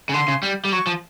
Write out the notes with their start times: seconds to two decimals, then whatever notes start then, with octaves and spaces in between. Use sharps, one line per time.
0.09 C#3
0.14 D3 C6
0.28 C#3
0.43 G3
0.65 G3
0.72 F#3 C#6
0.87 F3